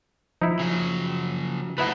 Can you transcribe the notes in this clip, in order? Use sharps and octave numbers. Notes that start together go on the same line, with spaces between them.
F3 D#4 E4
C#3 F#3
A3 B3 D#4 E4 B4